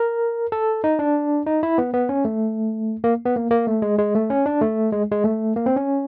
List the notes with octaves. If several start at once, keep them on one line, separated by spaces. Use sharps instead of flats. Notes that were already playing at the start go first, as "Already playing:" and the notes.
Already playing: A#4
A4
D#4
D4
D#4
E4
B3
B3
C#4
A3
A#3
B3
A#3
A#3
A3
G#3
G#3
A3
C#4
D4
A3
G#3
G#3
A3
A#3
C4
C#4